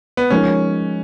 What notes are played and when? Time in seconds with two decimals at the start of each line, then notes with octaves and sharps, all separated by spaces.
0.17 B3
0.30 F3 G#3 C#4 D#4 A#4 C#5